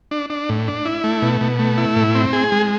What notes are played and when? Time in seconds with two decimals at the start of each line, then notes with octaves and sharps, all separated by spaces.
0.11 D4
0.30 D4
0.49 A2
0.68 D4
0.85 E4
1.04 A3
1.22 B2
1.41 B2
1.59 A3
1.78 E4
1.96 A2
2.15 C4
2.33 G#4
2.52 G#3